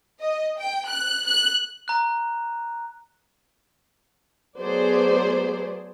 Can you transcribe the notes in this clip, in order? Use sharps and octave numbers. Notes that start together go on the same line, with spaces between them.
D#5
G5
F#6
F#6
A#5 F#6
F#3 A3 B3 G#4 C5 D5